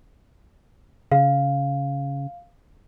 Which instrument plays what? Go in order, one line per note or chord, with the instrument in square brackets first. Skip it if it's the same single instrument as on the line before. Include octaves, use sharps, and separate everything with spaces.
[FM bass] C#3 [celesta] F5